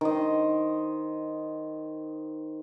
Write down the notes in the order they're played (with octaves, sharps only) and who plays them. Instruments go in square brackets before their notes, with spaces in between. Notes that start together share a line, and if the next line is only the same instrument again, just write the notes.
[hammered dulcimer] D#3 C5 D#5